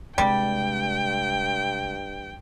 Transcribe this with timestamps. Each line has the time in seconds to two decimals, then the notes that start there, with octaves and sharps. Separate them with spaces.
0.18 G2 C3 G3 G#3 G5